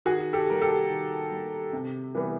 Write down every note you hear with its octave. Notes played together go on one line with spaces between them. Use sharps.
D#3 F#4 G#4
G4 A4
G3 A#3 A#4
G4 A4
D#3
G3 A#3
C3
E3 G3 B3